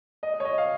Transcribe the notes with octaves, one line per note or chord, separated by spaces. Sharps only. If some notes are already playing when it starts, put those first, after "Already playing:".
D#5
D#5
C#5
D#5
F5